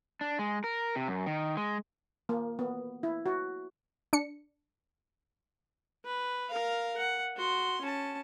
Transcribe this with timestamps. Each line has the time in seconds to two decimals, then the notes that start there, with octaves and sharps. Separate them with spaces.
0.21 D4
0.39 G#3
0.64 A#4
0.95 C3
1.08 F#2
1.26 D#3
1.57 G#3
2.29 A#3
2.59 B3
3.03 E4
3.26 F#4
4.13 D4 C#7
6.05 B4
6.50 A#4 F5
6.98 F#5
7.37 F#4 C6
7.81 C#4 A5